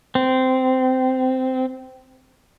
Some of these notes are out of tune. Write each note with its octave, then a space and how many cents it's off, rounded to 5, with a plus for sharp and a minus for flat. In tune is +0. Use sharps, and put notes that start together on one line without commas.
C4 -15